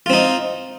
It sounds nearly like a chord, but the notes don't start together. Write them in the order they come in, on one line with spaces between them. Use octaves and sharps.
F4 C4 D#4